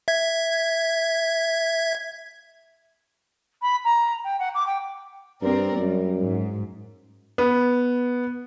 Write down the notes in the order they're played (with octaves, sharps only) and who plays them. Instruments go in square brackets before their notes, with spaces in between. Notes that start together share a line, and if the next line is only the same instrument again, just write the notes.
[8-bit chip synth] E5 G#6
[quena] B5
A#5
G5
F#5
D6
G5
[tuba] G2 [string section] C4 A#4 D5
[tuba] F#2 [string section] G3
[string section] G#2
[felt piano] B3